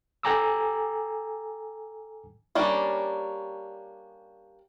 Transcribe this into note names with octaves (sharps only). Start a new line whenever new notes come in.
A4 G5 G#5 A#5 D6 E6
G3 A#3 C#4 D4